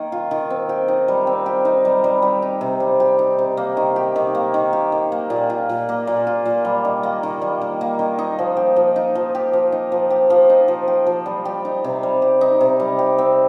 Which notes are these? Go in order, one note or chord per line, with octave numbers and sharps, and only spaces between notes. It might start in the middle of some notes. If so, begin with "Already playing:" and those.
Already playing: D#3 A#3
F4
D#3
C4
G4
D#4
G3
C4
G4
D#4
G3
G3
G4
D#4
C3
G3
G4
D#4
C3
A#3
D#3
G4
D#3
A#3
D#3
G4
D#3
A#3
A#2
F4
A#2
A#3
A#2
F4
A#2
G3
D#3
A#3
D#3
G3
D#3
A#3
D#3
D#4
F3
G4
F3
D#4
F3
G4
F3
D#4
F3
G4
F3
D#4
F3
G4
F3
G3
G4
D#4
C3
G3
G4
D#4
C3
G3
G4
C4